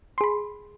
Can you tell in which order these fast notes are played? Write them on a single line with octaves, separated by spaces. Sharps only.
C6 G#4 B5